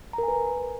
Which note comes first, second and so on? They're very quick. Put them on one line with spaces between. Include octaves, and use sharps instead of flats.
A#5 A#4 G#5 B4